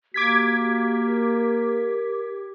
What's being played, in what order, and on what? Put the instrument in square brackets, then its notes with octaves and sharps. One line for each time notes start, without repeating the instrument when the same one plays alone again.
[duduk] A#3 [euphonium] F#4 [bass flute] G4 [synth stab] D6 G#6 B6
[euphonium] A#4